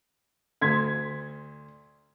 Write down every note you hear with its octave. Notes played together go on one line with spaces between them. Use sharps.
D2 C6 G#6 B6